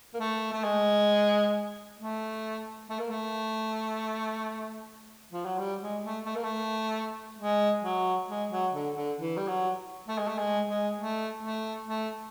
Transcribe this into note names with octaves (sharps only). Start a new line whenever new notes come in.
A#3
A3
A3
G#3
A3
A3
A#3
A3
F3
F#3
G3
G#3
A3
A3
A#3
A3
G#3
F#3
G#3
F#3
D3
D3
E3
G3
F#3
A3
G#3
A3
G#3
G#3
A3
A3
A3